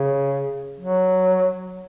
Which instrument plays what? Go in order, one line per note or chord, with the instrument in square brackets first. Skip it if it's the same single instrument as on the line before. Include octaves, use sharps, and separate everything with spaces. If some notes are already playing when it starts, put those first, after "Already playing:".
Already playing: [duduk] C#3
F#3